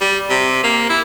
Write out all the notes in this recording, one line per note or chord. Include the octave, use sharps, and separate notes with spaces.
G3
C3
A#3
E4